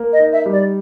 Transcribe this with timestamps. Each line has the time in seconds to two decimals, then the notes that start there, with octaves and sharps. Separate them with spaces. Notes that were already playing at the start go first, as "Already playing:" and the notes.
Already playing: A#3
0.12 D#5
0.19 D#4
0.32 E5
0.46 G3
0.52 D5